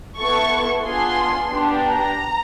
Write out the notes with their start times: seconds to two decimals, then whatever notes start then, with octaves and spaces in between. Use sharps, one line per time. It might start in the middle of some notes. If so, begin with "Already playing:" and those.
0.18 B3 E4 A4 C#6
0.84 B3 D4 F4 G#4 C6
1.51 B3 D4 G4
1.83 A#5